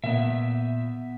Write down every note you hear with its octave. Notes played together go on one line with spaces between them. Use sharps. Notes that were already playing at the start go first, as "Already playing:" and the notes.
A#2 B3 E5